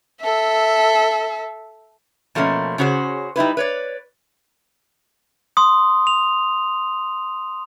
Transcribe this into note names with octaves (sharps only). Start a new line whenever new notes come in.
A4 E5
B2 F3 A3 A#3 C#4
C#3 C#4 F#4 G#4 C5
G3 D#4 E4 B4
B4 C#5 D5
C6 D#6
F7